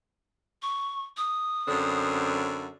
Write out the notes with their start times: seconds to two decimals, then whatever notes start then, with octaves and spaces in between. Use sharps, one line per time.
0.62 C#6
1.17 D#6
1.67 F#2 D3 C4